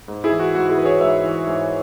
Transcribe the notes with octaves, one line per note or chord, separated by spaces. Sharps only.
G#2
E4 G#4
E3
F#4
G#2 F#4
E4 G#4
E3 B4
G#4 C#5
G#2 B4 E5
E3
G#2